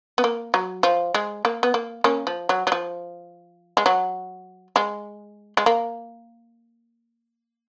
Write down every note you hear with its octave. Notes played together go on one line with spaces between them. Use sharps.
B3
A#3
F#3
F3
G#3
A#3
B3
A#3
A#3 C#4
F3
F#3
F#3
F3
G#3
F#3
G#3
G#3
A#3